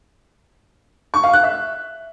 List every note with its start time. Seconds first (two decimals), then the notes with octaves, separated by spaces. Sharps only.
1.14 C#6
1.24 F5
1.33 F#6
1.43 E5